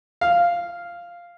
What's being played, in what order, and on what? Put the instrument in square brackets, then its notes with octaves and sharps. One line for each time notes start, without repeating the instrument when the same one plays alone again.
[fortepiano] F5